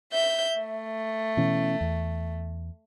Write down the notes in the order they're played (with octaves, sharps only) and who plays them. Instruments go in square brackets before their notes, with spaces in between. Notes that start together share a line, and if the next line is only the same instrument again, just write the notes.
[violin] E5 G6
A3
[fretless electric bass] B2 E3 C#4
E2